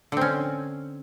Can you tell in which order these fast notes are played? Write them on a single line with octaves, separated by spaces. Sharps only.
D3 C4 C#4